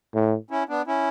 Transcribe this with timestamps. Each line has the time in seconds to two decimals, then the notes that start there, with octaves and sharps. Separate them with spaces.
0.14 A2
0.50 C#4 E4
0.69 B3 D4
0.87 C#4 E4